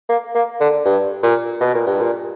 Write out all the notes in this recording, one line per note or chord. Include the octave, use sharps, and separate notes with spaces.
A#3
A#3
D3
G2
A#2
B2
A#2
G2
A#2